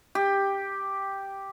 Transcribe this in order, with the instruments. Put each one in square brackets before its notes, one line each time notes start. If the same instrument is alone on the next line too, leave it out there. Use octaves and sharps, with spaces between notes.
[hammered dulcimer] G4